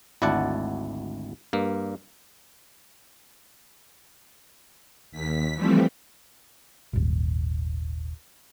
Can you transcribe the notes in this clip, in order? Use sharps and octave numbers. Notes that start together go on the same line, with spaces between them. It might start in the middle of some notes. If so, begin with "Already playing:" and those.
G#1 D2 E4 D5 F#5 A5
G2 A#3
D#2 B6
E3 F3 G3 A3 C4
D#1 G#1